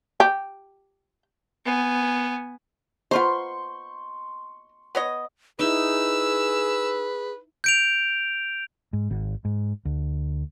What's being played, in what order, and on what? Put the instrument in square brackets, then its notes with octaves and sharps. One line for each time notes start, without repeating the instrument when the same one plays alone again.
[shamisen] G4
[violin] B3 G#5
[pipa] B3 F4 C5 [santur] C6 C#6
[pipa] B3 C#5 D#5
[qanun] D#4 E4 [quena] G#4 [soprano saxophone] B4 [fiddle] E6
[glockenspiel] G6 D7 F7
[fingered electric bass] G#2
G#1
G#2
D2